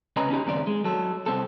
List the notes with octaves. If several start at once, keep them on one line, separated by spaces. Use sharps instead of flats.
C#2 C3 C#4 B4 D#5 A#5
C#4 D#4 G4 A#5
C#2 F#2 D#3 C4 G#4 D5
G#3
F#3 A4
C2 C4 A4